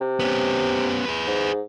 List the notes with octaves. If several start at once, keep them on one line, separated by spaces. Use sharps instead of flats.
C3
B3 C#4
G#4 B4
G#2